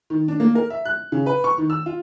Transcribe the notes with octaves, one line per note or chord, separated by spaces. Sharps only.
D#3
D4
A#3
A#4
E5
F#6
C#3
B4
C#6
D#3
E6
F4